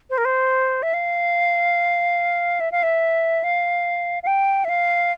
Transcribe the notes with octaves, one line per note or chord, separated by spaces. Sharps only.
C5
A#4
C5
E5
F5
E5
F5
E5
F5
F5
G5
E5
F5